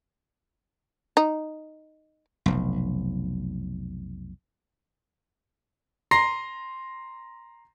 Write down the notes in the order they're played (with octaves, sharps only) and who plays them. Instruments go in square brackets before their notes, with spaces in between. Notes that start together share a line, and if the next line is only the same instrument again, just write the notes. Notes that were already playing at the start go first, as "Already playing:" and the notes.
[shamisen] D#4
[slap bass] F1 B1
[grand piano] A#5 C6 A#6 C7